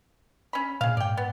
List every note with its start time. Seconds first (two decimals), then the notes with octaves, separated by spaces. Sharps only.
0.53 C#4 B5
0.81 A#2 G#4 F5
0.97 G#2 D5 G5
1.17 B3